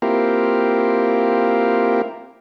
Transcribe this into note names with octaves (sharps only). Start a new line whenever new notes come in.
A#3 C4 E4 F4 G4 A#4